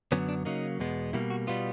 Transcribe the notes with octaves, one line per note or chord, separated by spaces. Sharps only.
F#2 D3 F#3 B3 C#4
D4
C#3 F#3 A#3 D#4
E2 B2 G#3 B3
B2 G3 A#3 E4
F#4
B2 G3 B3 F4